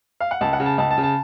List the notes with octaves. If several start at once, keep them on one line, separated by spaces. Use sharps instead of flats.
F5
F#5
C#2 A5
F#5
C#3
A5
C#2 A5
A5
C#3
A5